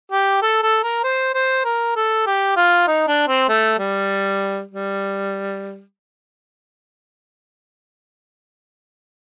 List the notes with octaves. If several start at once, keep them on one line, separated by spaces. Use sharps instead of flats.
G4
A4
A4
A#4
C5
C5
A#4
A4
G4
F4
D#4
D4
C4
A3
G3
G3